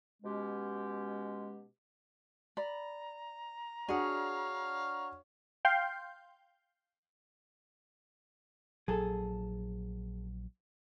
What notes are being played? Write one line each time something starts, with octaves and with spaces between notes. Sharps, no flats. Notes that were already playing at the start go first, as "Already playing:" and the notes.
B2 G#3 C#4 G4
D5 A#5 B5
D4 F#4 G#4 C#5 D5 F5 F#5
F5 G5 C6 G6
A#1 F#3 G#4 A4